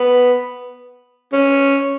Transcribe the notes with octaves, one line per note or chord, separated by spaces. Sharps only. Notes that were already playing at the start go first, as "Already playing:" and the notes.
Already playing: B3
C#4